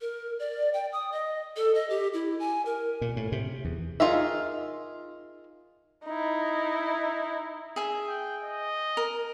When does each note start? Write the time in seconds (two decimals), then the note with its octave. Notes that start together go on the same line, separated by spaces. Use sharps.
0.01 A#4
0.39 D5
0.73 G5
0.93 D#6
1.12 D#5
1.56 A4
1.75 D#5
1.90 G4
2.14 E4
2.39 G#5
2.66 A#4
3.01 A#2
3.17 A2
3.32 C3
3.65 E2
4.00 D#4 F4 G#4 A#4 E5
6.05 D#4 E4
7.76 G#4 E5
8.09 G5
8.43 D#5
8.97 A#4